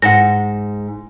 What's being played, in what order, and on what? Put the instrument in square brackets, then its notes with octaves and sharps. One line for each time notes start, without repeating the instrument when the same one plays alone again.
[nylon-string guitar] G#2 [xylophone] F#5 A#6